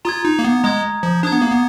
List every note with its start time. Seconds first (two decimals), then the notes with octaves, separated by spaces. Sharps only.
0.05 F4 A#5 D#6 G#6
0.25 D#4
0.39 A#3
0.44 B3
0.63 G#3 A#5 D#6 G#6
1.03 F3
1.23 D4 A#5 D#6 G#6
1.32 B3
1.42 A#3
1.51 B3